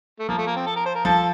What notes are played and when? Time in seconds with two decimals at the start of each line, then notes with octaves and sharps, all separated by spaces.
0.19 A3
0.29 F3 A#3
0.38 A3
0.47 A#3
0.56 C4
0.66 A4
0.76 A#4
0.86 C5
0.96 A#4
1.05 F3 A4